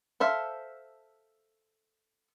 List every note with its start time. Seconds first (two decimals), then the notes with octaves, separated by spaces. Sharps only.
0.20 A4 C5 E5 F5